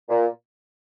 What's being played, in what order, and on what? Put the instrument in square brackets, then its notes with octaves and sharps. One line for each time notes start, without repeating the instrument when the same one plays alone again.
[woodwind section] A#2